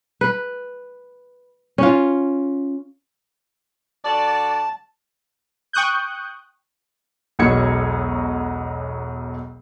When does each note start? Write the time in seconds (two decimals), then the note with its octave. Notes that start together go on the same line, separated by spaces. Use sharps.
0.21 B4
1.78 C#4 F4
4.05 D3 F#4 D5 A5
5.73 G5 C#6 D#6 F#6 G6
7.39 E1 B1 F#3 D#5 G#6 C#7